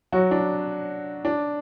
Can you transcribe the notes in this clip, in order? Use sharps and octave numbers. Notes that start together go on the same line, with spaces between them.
F#3 F#4
D4
D4